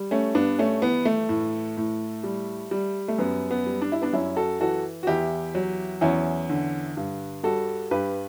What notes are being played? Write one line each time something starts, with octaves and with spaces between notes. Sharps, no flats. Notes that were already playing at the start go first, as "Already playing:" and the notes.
Already playing: G3
A3 C#4
G2 B3 D4
A3 C#4
E3 B3
A3
A2
A2
G3
G3
A3
F#2 B3
B3
G3
D4
E4
B3 D4
F#2 C#4 E4
F#4 A4
E3 F#4 A4
F#4
E2 E4 G4
F#3
E2 C#4 E4
D3
G2
G3 F#4 A4
G2 G4 B4